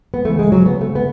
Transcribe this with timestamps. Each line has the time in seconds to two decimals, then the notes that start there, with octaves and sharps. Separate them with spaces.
0.14 B3
0.25 D2 C#3 E3 A3
0.39 G#3
0.52 F#3
0.66 B3
0.81 A3
0.95 B3